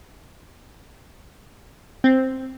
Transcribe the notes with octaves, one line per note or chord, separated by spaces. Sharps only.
C4